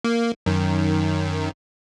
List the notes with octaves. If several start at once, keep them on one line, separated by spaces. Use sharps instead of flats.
A#3
F#2 D#3